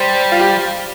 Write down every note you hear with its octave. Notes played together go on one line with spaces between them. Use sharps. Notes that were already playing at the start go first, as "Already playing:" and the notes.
Already playing: G3 C5
F4
G4